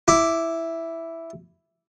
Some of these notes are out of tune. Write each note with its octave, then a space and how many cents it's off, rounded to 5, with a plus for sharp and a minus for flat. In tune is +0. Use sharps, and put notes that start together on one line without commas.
E4 +0 D6 +0